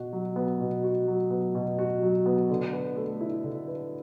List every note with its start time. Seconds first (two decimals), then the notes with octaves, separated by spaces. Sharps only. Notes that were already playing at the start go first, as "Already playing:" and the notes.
Already playing: B2 F#4
0.13 F#3
0.36 B3
0.60 B2
0.84 F#4
1.07 F#3
1.31 B3
1.55 B2
1.79 F#4
2.02 F#3
2.26 B3
2.50 D3
2.73 B4
2.96 A3
3.21 E4
3.44 D3
3.68 B4